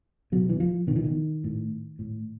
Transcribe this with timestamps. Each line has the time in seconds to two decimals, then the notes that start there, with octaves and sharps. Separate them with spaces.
0.32 B2 F#3
0.49 E3
0.60 F3
0.87 B2 D#3
0.96 E3
1.04 D#3
1.44 A2
1.99 A2